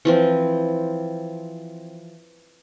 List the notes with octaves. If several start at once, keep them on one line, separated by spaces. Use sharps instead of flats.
E3 F3 C4